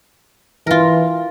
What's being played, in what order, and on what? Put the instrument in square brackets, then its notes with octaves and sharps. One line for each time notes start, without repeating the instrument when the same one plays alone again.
[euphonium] E3 [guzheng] F4 A#4